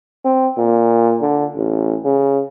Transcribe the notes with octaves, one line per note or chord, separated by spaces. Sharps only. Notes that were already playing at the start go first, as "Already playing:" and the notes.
C4
A#2
D3
A1
C#3